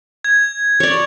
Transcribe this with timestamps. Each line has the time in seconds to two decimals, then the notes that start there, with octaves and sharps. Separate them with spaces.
0.24 G#6
0.80 C#5 D5